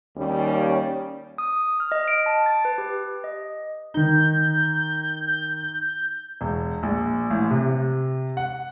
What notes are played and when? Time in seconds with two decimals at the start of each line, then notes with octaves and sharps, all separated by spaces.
0.16 D#2 G3 C#4
1.38 D#6
1.80 F6
1.92 D#5
2.08 D7
2.26 A5
2.46 A6
2.65 B4
2.78 G4
3.24 D#5
3.94 D#3 D#4 G6
6.41 E1
6.83 A#1
7.31 A1
7.51 C3
8.37 F#5